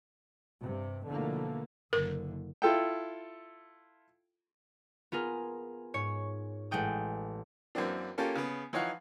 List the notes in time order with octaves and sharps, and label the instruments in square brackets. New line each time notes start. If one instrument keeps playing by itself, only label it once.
[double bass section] G2 C3
B2 D3 E3 F3 A3 A#3
[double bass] F#1 D3 [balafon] A#4
[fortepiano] E4 F4 A4 G5
[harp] B3 F4 G#4 A#4
G#2 C#5 C#7
A1 G#3 F#5 G5 D#6
[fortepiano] F#2 E3 A#3 C4 D4
A#3 C#4 F4 G4 A4
C#3 B3
E3 F3 D#4 C#5 F5 F#5